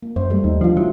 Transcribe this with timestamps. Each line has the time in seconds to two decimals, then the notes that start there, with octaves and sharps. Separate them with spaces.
0.03 A#3
0.16 F#2 C5
0.30 G3 A3
0.44 D#2 D#4
0.61 F3 D4 F4
0.77 F#3 E4